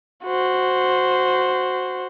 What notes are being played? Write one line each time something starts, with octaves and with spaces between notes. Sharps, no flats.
F#4 C5